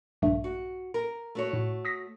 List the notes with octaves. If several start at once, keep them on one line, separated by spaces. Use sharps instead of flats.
A#1 G2 A3
F#4
A#4
A3 F#4 C#5
A2
D#6 A#6 B6